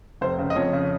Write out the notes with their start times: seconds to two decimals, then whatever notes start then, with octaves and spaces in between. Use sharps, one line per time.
0.21 F1 C5
0.38 C#3
0.50 D#5
0.56 F2 C#5
0.73 C#3